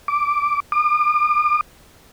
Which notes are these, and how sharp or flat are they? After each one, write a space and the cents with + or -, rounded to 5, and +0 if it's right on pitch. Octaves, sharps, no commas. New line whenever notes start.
D6 -5
D6 +45